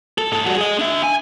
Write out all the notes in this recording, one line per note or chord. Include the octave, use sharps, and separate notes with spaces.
A4
G#2 A4
G3 F#4
G#4 D#5
D4 E5
G#5